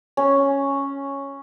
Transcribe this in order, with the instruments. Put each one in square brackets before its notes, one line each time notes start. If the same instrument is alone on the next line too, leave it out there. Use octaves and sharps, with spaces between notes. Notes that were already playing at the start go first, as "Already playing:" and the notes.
[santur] C#4